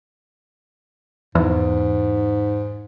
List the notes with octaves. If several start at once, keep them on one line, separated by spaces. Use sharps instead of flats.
E2 G#2